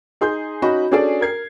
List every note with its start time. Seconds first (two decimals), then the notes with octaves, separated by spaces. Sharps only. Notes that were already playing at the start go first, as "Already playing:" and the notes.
0.21 D#4 G#4 C6 G6
0.62 C#4 D#4 F#4 D#5 B5
0.91 C#4 D4 F#4 G#4 A4 D5
1.21 A#4 G#6 C7